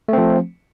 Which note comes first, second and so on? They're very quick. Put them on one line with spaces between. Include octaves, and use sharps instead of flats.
A3 C4 F3